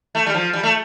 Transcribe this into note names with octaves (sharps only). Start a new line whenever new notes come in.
A3
G3
F3
G3
A3